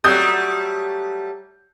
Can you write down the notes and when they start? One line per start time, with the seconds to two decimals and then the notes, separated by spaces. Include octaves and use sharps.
0.04 F#3 G3 A3 D#6 G6